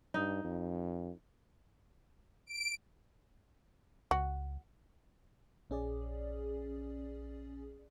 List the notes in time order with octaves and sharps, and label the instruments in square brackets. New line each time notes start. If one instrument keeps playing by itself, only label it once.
[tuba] G2 [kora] D#4
[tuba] F2
[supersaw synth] D7
[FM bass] C#2 [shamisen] F#4
[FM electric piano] A#1 C#4 G#4 D5